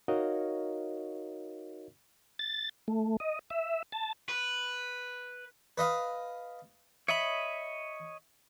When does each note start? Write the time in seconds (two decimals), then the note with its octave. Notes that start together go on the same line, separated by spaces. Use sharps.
0.08 D#4 F#4 A#4 C#5 D#5 F5
2.39 A6
2.88 A3
3.20 D#5
3.50 E5
3.92 A5
4.29 B4
5.78 B4 D#5 F5
7.08 C#5 D#5 E5 B5